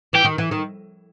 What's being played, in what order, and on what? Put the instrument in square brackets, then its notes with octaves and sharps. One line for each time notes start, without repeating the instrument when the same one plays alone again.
[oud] E3 [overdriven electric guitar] G4
[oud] D#3
E3
D#3